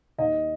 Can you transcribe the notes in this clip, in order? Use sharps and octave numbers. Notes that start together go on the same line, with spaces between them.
D#2 D#5